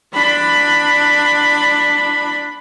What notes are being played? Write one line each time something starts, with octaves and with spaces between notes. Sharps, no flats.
D4 B5